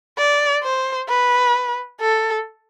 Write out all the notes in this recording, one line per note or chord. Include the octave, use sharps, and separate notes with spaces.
D5
C5
B4
A4